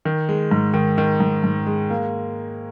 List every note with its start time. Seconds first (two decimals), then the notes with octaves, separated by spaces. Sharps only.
0.05 D#3
0.29 G#3
0.51 G#2
0.74 D#3
0.98 D#3
1.20 G#2
1.44 G#2
1.67 G#3
1.90 A#3